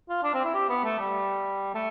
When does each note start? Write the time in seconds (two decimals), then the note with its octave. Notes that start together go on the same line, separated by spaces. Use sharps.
0.09 F4
0.23 D4
0.34 C4
0.44 E4
0.54 G4
0.69 B3
0.84 A3
0.99 G3
1.74 A3